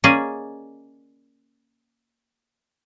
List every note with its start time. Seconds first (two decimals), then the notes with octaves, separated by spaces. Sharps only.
0.04 A#3 C#4 G#4 D5 D#5 G#5